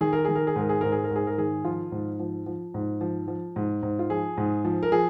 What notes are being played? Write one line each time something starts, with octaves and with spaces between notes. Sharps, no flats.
D#3 G#4
A#4
D#3 G#4
A#4
G#4
G#2 A#4
G#4
G#2 A#4
G#4
A#4
G#2 G#4
A#4
D#3 G#4
F3 F4
G#2
F3
F3
G#2
F3
F3
G#2
G#2
F4
F3 G#4
G#2
F3
A#4
F3 G#4